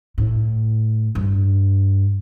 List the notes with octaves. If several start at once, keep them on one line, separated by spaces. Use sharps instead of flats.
A2
G2